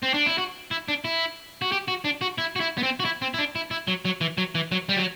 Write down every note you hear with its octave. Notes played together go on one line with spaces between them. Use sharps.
C4
D4
E4
F#4
E4
D4
E4
F#4
G4
F#4
D4
F#4
E4
F#4
E4
B3
C4
F#4
E4
C4
E4
D4
E4
E4
F#3
F#3
E3
F#3
E3
F#3
G3
F#3